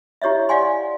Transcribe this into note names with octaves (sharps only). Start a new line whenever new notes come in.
E4 G4 C#5 D#5 E5
D5 F5 F#5 G#5 C6